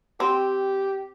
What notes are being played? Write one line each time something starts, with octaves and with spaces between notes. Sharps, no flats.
C4 G4